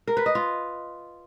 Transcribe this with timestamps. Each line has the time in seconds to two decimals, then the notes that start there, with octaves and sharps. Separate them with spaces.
0.07 A#4
0.17 B4
0.26 D#5
0.35 F4